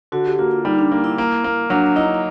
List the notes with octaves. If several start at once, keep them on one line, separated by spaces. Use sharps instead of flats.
D3 F#4
G4
A#3 F#4
F4
G3 D#4
D4
A#3 D#4
E4
A#3
A#3
F#3 D4
D#4 E4